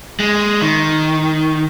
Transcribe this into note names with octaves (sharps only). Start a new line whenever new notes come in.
G#3
D#3